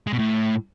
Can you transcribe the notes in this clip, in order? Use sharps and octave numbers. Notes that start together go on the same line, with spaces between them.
G#3
B2
A2